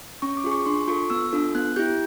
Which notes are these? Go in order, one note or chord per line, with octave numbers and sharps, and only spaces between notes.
C#4 C#6
D6
F4 G#4
C#6
D4 C6
F4 A4 C#6
B3 E6
D4 F4 A4
B3 F#6
E4 G4 G6